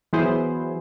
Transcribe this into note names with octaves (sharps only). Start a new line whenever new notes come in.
E3 F#3 B3 E4 G#4 C5